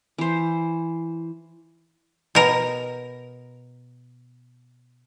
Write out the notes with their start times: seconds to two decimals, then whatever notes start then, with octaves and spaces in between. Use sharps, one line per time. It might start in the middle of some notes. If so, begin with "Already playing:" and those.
0.18 E3 C5
2.35 B2 A#4